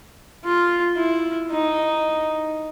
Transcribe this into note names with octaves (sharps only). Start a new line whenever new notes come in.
F4
E4
D#4